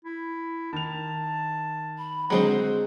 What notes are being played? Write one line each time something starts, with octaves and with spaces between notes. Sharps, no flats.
E4
D#3 A5 F7
B5
D3 F#3 G#3 C4 G#4 C5 F#5